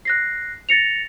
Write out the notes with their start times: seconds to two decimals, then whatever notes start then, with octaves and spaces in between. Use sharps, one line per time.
0.05 F#6 A#6 C7
0.69 A6 A#6 C#7 F7